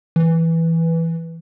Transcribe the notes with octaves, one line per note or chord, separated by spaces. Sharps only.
E3